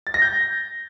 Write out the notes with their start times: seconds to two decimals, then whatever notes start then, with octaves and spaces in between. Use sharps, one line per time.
0.07 A6
0.14 A#6
0.22 G6